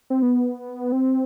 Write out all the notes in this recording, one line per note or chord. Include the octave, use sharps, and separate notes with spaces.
C4
B3
C4